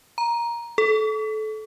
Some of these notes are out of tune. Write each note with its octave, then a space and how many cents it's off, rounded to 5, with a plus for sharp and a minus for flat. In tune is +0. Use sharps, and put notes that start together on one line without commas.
A#5 +10
A4 -25